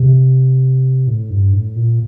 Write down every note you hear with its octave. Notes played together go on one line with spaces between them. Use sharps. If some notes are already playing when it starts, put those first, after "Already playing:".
Already playing: C3
A2
G2
A2
A#2